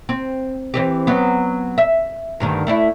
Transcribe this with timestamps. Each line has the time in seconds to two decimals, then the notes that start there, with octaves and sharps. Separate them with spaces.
0.09 C4
0.74 E3 C4 G4
1.07 F#3 B3
1.78 E5
2.40 D2 G2 D#3
2.67 A3 D4 E4